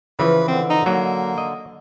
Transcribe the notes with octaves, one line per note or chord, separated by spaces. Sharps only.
C#3 E3 F3 B4
D3 C4
D#4
F#3 A#3
D#5